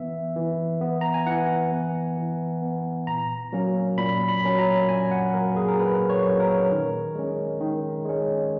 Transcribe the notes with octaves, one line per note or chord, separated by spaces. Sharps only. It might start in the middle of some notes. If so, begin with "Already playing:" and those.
Already playing: E3 B3 E5
E3
B3
A#5
G#5
E3 F#5
B3
E3
B3
A#2 A#5
F#3 A#3 C#4
A#2 B5
B5
F#3 A#3 C#4
A#5
A#2 G#5
F#5
F#3 A#3 C#4 A#4
G#4
A#4
A#2 B4
C#5
F#3 A#3 C#4
A#4
D#3
G#3 C#4
D#3
G#3 C#4